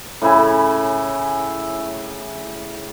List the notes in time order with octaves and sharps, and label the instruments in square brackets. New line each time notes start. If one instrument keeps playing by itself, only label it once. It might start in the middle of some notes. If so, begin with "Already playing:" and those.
[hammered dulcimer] A2 C#3 E4 G#5